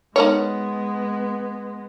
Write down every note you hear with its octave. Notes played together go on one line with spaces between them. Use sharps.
G#3 B3 D#4 A#4 C#5